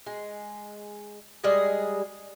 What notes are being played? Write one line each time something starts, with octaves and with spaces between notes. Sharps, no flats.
G#3
G3 G#3 G#4 D#5